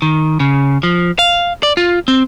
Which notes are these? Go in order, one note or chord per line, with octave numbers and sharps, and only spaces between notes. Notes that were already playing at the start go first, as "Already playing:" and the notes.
D#3
C#3
F3
F5
D5
F4
C4